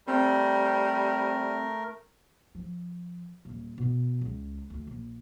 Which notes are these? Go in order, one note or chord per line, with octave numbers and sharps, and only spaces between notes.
G3 A3 C4 A#4
F3
D#1
B2
C#2
D2
A#1